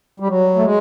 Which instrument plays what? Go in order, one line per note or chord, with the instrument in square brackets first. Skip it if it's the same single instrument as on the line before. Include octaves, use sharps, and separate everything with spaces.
[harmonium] G3
F#3
A3
G#3